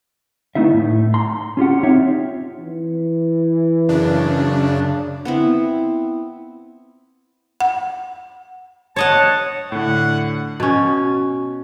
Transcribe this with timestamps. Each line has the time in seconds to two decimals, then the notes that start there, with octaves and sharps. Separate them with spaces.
0.55 A3 B3 D#4 E4 E5
0.74 A2
1.14 A#5 C6
1.57 C#4 F4 G4 F#5
1.83 C4 D#4 F4 C#5 E5
2.59 E3
3.89 F#2 C#3 D4
5.25 B3 C4 E4
7.60 F#5
8.96 C#5 D#5 F#5 A5
9.72 A2 D3 F#5
10.60 B2 C#4